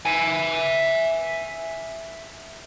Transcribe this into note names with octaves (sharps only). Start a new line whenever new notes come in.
E5 G#5